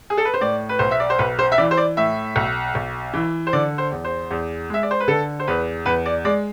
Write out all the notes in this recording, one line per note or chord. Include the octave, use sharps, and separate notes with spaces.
G#4
A4
B4
C5
A2 D5
B4
B1 C5
E5
D5
C5
B1 B4
C5
E5
E3 D5
C5
D5
A2 E5
B1
B1
E3
C5
D3 D5
C5
E2
C5
E2
G#3 E5
D5
C5
B4
D3 A4
C5
E2 B4
E2 B4
D5
G#3 D5